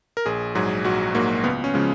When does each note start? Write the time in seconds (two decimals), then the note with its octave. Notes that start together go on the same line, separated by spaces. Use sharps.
0.17 A#4
0.26 A#1 G#4
0.55 G#2 F#3 G#4
0.84 A#1 F#4
1.15 G#2 F#3 A#3
1.44 C#2 B3
1.64 C#4
1.74 C#3 F3 G#3